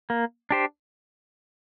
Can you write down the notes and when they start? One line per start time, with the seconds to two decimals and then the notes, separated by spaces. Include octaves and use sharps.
0.10 A#3
0.51 D4 G4 C5